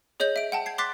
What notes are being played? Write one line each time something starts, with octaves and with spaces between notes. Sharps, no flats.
G#4 C#5 D#5 G6 F#7
E5 D7
F#5 G5 A5
G#6 C7
C6 D6 F#6 A6 B6 C7